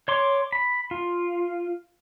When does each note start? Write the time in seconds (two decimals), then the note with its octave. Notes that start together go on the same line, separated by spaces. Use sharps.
0.08 C#5 C6 D6
0.52 B5
0.91 F4